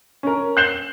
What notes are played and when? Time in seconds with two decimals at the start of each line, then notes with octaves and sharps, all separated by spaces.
0.23 C#4 A#4
0.57 F#6 G6 C7 E7 F#7 G7